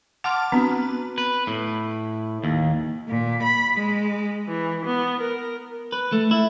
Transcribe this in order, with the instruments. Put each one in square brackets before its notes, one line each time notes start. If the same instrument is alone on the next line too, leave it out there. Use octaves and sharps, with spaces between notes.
[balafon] F#5 C6 [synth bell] A5 D6 F6
[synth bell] B3 [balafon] C4 D4 F#4
[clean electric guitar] B4
A2
D#2
[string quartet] A#2
B5
G#3
E3
B3
A#4
[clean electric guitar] B4
A3
E4